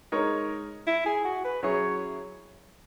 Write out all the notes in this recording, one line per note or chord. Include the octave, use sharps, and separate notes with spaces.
G#3 D#4 A#4 C#5
E4
G#4
F#4
B4
F#3 C#4 E4 G#4 C#5